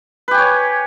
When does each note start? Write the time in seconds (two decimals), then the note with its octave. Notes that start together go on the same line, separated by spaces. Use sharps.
0.28 B4
0.31 G4
0.34 G#5
0.38 C#5